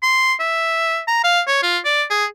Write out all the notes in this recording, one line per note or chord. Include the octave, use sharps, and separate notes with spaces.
C6
E5
A#5
F5
C#5
F4
D5
G#4